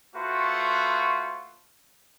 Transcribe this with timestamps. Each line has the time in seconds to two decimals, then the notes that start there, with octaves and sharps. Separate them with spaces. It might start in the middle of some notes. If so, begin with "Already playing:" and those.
0.14 A3 F4 F#4 B4 C5 C#6